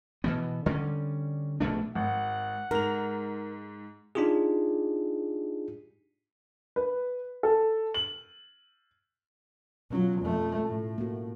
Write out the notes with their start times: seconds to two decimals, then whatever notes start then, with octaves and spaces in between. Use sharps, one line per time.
0.24 B2 E3 B3
0.66 D3 G3 B3 C#4
1.60 A#1 B2 A3 D4
1.95 G#1 F#5
2.71 G#2 A#4 F7
4.15 D4 D#4 F4 G4 G#4
6.76 B4
7.43 A4
7.94 F#7
9.91 B2 F#3 C#4 F4
10.21 F2 A3
10.67 A2
10.98 A#3 F#4